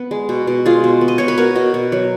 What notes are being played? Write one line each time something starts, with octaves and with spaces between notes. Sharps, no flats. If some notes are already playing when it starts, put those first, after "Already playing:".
Already playing: B3
G#3
B2
B2
G#3 F4 G#4
B2
B3
D#5
B2 C#5
B4
B3 F#4 A#4
B2
B2
F#3